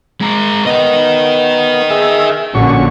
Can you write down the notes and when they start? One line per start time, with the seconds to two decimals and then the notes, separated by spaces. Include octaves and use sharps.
0.21 G#3 A#4
0.67 B3 A#4 D#5
1.90 G#4 E5
2.55 A#1 A#2 D3 C#4 F#4 C#6